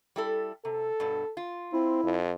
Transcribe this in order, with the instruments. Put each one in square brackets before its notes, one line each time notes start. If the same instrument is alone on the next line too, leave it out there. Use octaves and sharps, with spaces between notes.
[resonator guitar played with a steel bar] G3 E4 A4
[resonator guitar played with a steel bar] C3 [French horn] A4
[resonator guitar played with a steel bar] G2 B2
F4
[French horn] C4 [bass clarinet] E4
[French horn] F2